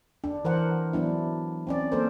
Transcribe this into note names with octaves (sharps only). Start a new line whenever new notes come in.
D4
E3 A#4 C5 F#5
F#3 B3 D4 E4
C4 C#4 D5
A#3 A4 A#4 C5